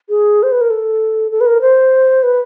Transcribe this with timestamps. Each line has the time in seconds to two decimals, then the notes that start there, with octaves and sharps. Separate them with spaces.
0.09 G#4
0.43 C5
0.52 B4
0.61 A#4
0.70 A4
1.31 A4
1.41 B4
1.46 A#4
1.61 C5
2.23 B4